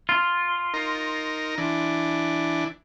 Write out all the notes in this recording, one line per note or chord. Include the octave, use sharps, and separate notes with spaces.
F4
D#4 A#4
E3 D4